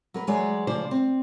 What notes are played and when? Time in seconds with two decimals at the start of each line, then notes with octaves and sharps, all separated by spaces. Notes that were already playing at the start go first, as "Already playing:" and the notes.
0.14 F#3 A#4 B4
0.27 E3 F#3 G#3 G#4 C#5 D5
0.67 D2 C#3 F3 C5 D5
0.91 C4